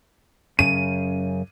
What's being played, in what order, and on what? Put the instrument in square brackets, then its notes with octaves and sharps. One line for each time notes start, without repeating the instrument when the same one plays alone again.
[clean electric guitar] F#2 C#3 [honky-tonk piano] D#7